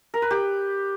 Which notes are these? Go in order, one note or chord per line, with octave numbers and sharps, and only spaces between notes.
A#4
B4
G4